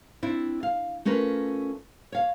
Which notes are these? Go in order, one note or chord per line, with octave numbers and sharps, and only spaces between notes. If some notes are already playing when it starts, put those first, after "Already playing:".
C4 D4 E4
F5
A3 C#4 F4 A#4 B4
C#5 F5